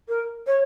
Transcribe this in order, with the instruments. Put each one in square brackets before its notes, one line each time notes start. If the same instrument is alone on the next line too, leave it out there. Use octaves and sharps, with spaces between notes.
[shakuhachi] A#4
C#5